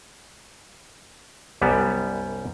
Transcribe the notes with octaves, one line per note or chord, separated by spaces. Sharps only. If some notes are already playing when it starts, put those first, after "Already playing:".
C2 F#2 G3 B3 G4